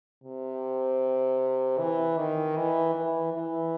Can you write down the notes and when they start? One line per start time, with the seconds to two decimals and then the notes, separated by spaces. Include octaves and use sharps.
0.24 C3
1.79 E3
2.17 D#3
2.57 E3
2.95 E3
3.33 E3